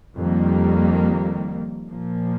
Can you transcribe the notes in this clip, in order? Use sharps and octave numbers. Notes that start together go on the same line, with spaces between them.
F2 D#3 G3 A#3
A#2 F3 A#3